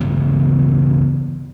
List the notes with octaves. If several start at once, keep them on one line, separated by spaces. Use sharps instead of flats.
G2 C#3 E3 B3